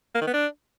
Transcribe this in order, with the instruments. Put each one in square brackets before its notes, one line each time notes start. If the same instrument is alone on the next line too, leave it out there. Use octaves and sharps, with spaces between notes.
[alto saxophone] A#3
D#3
B3
D4